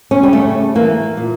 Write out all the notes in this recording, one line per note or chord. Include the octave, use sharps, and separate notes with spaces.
C#4
G3
C#3 A3
E3 A#3
A#2